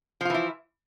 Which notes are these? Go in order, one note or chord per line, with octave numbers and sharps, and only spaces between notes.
E3 F3 E4 F4